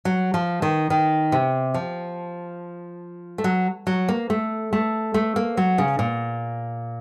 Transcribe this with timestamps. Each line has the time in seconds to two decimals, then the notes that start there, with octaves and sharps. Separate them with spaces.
0.05 F#3
0.34 F3
0.62 D#3
0.90 D#3
1.32 C3
1.74 F3
3.38 A3
3.44 F#3
3.87 F#3
4.08 A#3
4.30 A3
4.73 A3
5.14 A3
5.36 A#3
5.57 F#3
5.78 C#3
5.99 A#2